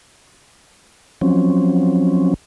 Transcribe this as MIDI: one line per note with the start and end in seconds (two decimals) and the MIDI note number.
1.21 2.34 53
1.21 2.34 54
1.21 2.34 60
1.21 2.34 61